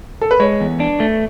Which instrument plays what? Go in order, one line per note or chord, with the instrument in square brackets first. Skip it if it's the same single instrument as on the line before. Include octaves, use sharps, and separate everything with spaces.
[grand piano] A4
B4
[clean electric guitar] G#3 [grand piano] C#5
[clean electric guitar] E2
D4
A3